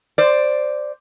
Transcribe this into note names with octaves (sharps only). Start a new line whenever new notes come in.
C5 D5